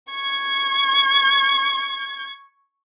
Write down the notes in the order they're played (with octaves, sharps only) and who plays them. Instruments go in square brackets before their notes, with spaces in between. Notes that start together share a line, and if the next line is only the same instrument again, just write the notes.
[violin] C#6 G#6